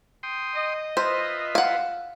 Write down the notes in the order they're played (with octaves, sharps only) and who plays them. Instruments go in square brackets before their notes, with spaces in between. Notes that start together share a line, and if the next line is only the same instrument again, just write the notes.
[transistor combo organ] G5 C6 D#6
[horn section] D#5
[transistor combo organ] F4 B4 E5 [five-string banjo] C5
[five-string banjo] F5 F#5